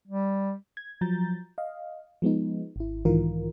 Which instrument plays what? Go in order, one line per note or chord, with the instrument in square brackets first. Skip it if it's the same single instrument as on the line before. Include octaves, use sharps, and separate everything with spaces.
[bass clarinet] G3
[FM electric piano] G#6
F3 F#3 A#5 G6 A6
D#5 F5
F3 G#3 B3 D#4
G#1 E4
B1 G#2 D#3 E3 F4 A#4